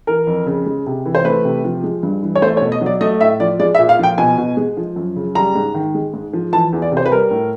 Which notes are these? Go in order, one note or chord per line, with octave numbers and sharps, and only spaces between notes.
E3 A#4
F2
C#3
G#3
C3
E3
C5
A3 B4
C3
F3
G#3
G2
E3
C#5
A3 C5
C#5
B2
D#5
F#3 D5
A3 D#5
A2 E5
F3 D5
G#3 D5
E5
A#2
F5
F3 G5
B2 G#5
B2
G#3
F3
F#2
C#3
G3 A#5
G#2
D#3
G#3
G#2
F3
E3 A5
E2
D5
C3
C5
B4
G3 A#4
A2